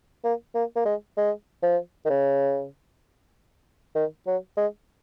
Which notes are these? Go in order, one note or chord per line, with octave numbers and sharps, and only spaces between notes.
A#3
A#3
A#3
G#3
G#3
F3
D#3
C#3
D#3
F#3
G#3